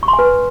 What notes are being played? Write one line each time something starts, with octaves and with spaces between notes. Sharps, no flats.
C#6
C6
G#5
B4